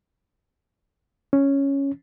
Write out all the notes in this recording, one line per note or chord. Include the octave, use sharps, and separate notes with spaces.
C#4